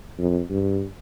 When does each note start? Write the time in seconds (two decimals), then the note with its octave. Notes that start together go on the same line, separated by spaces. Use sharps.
0.19 F2
0.50 G2